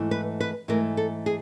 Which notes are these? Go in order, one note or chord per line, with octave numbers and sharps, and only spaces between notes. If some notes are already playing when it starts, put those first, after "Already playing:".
Already playing: G#2 E3 A3
B4
B4
G#2 E3 A3 A#4
A4
G#4